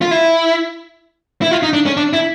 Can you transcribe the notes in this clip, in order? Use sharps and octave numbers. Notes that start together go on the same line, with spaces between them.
F4
E4
E4
F4
D#4
D4
C#4
D4
E4